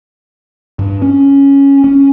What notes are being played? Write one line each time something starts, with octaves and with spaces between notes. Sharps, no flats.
G2
C#4
C#4